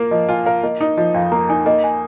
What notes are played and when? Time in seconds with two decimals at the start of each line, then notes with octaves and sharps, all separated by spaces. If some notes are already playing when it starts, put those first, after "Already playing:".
Already playing: A#3 F4 A#4
0.11 F3 D#5
0.29 F4 G#5
0.45 A#4 F5
0.63 A#3 D#5
0.81 D#4 D#5
0.97 F3 D#5
1.14 F2 F5
1.32 A#3 A#5
1.49 D#4 G#5
1.66 A#3 D#5
1.84 G#5